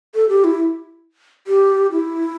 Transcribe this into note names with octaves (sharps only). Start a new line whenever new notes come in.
A4
G4
E4
G4
E4